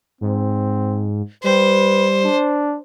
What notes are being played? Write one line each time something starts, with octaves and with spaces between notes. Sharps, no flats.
G#2 C4
G3 B4 C5
D4